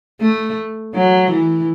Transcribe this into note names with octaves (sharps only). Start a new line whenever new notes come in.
A3
F#3
E3